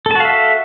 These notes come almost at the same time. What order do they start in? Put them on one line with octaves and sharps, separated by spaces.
A4 A5 F#4 F5 E5